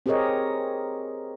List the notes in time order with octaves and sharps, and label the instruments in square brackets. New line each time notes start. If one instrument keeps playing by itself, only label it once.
[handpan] C4 G4 G#4 A#4 C#5 D#5